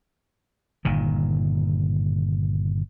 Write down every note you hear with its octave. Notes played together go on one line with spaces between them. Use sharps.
G1 A#2 D#3